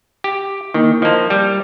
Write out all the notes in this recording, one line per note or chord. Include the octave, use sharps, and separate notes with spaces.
G4
D#3 A#3 E4
F3 A#3 D#5 A5 C6
G3